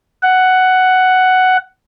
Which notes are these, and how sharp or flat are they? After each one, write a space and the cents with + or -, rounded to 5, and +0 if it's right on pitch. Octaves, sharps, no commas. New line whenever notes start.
F#5 +5